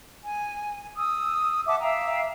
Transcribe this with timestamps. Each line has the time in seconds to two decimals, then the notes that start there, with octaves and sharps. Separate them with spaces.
0.24 G#5
0.97 D#6 E6
1.67 E5 F#5 A5 D6
1.81 E5 F5 G5 A#5